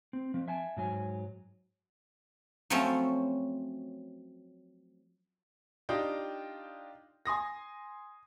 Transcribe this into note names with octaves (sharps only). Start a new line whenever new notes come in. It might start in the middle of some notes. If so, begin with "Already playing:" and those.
C4
F3 C4
E5 G#5 A5
G#2 F#3 G#5
F3 F#3 A3 C4 C#4 A4
D4 D#4 F4 G4 D#5 G5
G#5 C6 D#6 A#6